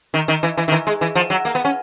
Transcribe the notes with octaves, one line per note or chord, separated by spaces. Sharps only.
D#3
D#3
E3
E3
D#3
E3
G#3
E3
F3
F#3
A#3
B3
C#4